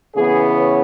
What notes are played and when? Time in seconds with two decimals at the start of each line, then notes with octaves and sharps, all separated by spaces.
0.15 C#3 E3 B3 G#4
0.54 C#5